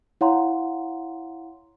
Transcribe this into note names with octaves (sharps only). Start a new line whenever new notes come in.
E4 C#5 F5 F#5 A#5 C6